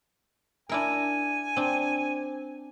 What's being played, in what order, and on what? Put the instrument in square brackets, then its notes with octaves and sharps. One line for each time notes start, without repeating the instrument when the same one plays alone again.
[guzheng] D4 E4 A#4 [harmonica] G#5
[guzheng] C4 D4